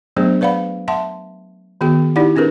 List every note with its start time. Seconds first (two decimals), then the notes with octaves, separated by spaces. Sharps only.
0.17 F#3 A3 B3 D4 G#4 C5
0.41 B4 D5 F5 F#5 B5
0.88 E5 F#5 A5 C6
1.81 D#3 B3 F#4 G#4 G5
2.16 D#4 E4 G4 D5 F#5
2.36 C4 D4 G#4 A#4 B4